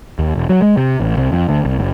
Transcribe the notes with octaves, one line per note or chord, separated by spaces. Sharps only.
D#2
E1
F#3
G#3
C3
A1
C2
F2
D2
C2
F#1